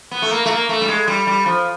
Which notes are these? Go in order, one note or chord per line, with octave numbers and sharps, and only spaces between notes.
B3
A3
A#3
A3
A#3
A3
G3
G#3
G3
G3
F3